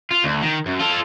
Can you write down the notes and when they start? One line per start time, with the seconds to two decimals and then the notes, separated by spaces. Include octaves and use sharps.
0.11 F4
0.24 D2
0.42 D#3
0.66 F#2
0.80 F4 A4